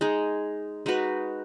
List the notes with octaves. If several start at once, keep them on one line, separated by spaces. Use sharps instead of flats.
G#3 D#4 G#4
G#3 D#4 F#4 B4